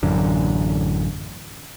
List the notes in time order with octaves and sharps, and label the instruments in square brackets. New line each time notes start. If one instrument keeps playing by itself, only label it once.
[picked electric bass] A1 F#2 D3